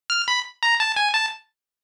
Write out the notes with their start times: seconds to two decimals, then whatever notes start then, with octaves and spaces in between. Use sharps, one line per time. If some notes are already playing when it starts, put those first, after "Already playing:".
0.10 F6
0.28 B5
0.63 A#5
0.80 A5
0.96 G#5
1.14 A5